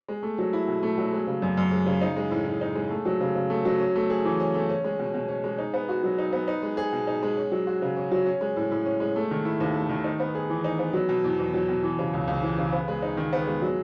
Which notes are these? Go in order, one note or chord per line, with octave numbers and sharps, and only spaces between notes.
G#3
A3
F#3
E4
B2
A3
F#3
G#3
C#3
F#2
F#2
G#3
C#3
D#4
G#3
A2
A2
D#4
G#3
A3
F#3
C#3
C#3
A3
F#3
C#4
A3
G#4
E3
C#4
A3
C#4
G#3
B2
B2
C#4
G#3
D#4
B3
F#4
F#3
D#4
B3
D#4
G#3
G#4
B2
D#4
G#3
C#4
F#3
F#4
C#3
C#4
F#3
C#4
G#3
A2
A2
C#4
G#3
A3
D#3
E4
D#2
A3
D#3
D#4
B3
G#4
E3
D#4
B3
F#3
B2
E2
E2
F#3
B2
E3
C#3
C#2
C#2
E3
C#3
B3
G#3
D#4
D#3
B3
G#3
F#3